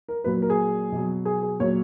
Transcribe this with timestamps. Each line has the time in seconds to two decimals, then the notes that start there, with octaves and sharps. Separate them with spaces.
0.09 A#4
0.24 A#2 F#3 B4
0.42 A#4
0.50 G#4
0.92 B2 F#3
1.25 G#4
1.43 G#4
1.60 A#2 F#3 C#5